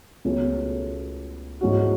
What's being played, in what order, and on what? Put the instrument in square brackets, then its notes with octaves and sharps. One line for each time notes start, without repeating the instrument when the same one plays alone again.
[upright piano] C#2 B2 A3 C#4
G#2 E3 A3 C#4 F#4